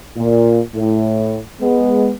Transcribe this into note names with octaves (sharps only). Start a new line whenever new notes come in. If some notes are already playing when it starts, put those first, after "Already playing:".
A#2
A2
G#3 B3